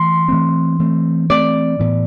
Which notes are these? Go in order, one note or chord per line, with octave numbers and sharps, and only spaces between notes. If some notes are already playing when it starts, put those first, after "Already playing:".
Already playing: E3 A3 C6
E3 A3 C4
E3 A3 C4
E3 A3 C4 D5
A2 E3 B3